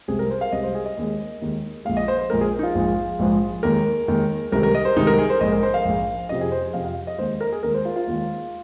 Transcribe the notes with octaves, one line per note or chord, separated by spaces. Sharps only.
C2 C3 G#3 G#4
A#4
C5
F5
C2 C3 G#3 D#5
C5
G#4
D#5
D#2 D#3 G#3
D#2 D#3 G#3
A#1 A#2 G#3 F5
D#5
C5
C5
A#1 A#2 G#3 A#4
G#4
D#4
F4
A#1 G#2 F3 G#3
A#1 G#2 F3 G#3
D#2 D#3 G#3 A#4
D#2 D#3 G#3
C2 C3 D#3 G#3 A#4
A#4
D#5
C5
C2 C3 D#3 G#3 D#4
A#4
G#4
C5
A#1 G#2 G#3 D#5
A#4
C5
F5
A#1 G#2 G#3
F2 C3 F3 D#5
G#4
C5
F2 C3 F3 F5
F5
D#5
D#2 D#3 G#3 C5
A#4
G#4
D#2 D#3 G#3 A#4
C5
F4
F4
D#2 D#3 G#3